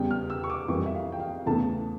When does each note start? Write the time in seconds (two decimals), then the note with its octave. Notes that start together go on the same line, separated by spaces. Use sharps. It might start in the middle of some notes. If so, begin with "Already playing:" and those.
Already playing: E2 C#3 G3 G5
0.11 F6
0.30 E6
0.44 C#6
0.50 D6
0.68 F2 E3 G3 A#3 C#6
0.86 E5
0.95 F5
1.12 G5
1.20 F5
1.46 E2 C#3 E3 A3 A5